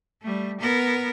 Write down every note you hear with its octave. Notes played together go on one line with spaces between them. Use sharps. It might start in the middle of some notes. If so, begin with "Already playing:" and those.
G3 A3
B3 A#4